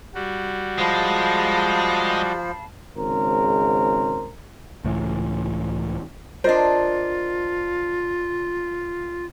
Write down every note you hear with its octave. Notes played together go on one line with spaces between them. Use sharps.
G3 F#4
F3 G#3 F5 A5 B5
G#1 C#3 G#3 A#4 C5
C#2 A2 E3
D4 F4 A#4 C5 D#5